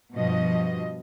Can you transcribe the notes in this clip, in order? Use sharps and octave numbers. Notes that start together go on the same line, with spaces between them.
G2 B2 F3 D#5